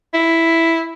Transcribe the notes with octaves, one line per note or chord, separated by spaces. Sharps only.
E4